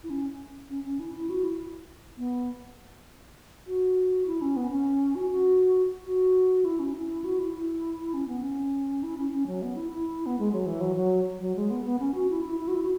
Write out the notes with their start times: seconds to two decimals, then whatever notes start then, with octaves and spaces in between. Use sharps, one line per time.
0.04 E4
0.10 C#4
0.69 C#4
0.85 C#4
1.00 E4
1.14 E4
1.30 F#4
1.44 E4
2.18 B3
3.67 F#4
4.26 E4
4.42 C#4
4.56 B3
4.71 C#4
5.15 F#4
5.31 F#4
6.05 F#4
6.65 E4
6.79 C#4
6.94 E4
7.24 F#4
7.39 E4
7.54 E4
8.14 C#4
8.28 B3
8.43 C#4
9.03 E4
9.18 C#4
9.32 C#4
9.47 F#3
9.62 B3
9.76 E4
9.92 E4
10.26 B3
10.39 G#3
10.53 F#3
10.66 E3
10.81 F#3
10.96 F#3
11.40 F#3
11.56 G#3
11.71 B3
11.85 B3
12.00 C#4
12.15 F#4
12.30 E4
12.45 E4
12.60 E4
12.68 F#4
12.75 E4
12.83 F#4